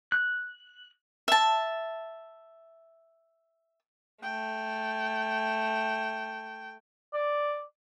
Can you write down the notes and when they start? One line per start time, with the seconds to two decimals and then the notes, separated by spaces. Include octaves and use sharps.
0.12 F#6
1.28 E5 A5
4.23 A3 G5
7.13 D5